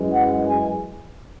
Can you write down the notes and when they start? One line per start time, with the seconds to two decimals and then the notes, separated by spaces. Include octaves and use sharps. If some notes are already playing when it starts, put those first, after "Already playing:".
Already playing: F#2 E3 G#3
0.12 F#5
0.46 G#5